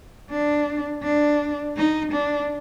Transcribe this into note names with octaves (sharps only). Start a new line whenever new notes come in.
D4
D4
D#4
D4